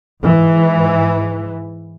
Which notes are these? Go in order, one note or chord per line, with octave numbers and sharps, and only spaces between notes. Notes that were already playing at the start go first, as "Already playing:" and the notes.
G#2 E3